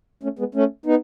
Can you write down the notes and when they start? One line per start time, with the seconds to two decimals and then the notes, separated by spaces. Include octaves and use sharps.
0.23 A3 C#4
0.39 G#3 B3
0.55 A3 C#4
0.86 B3 D#4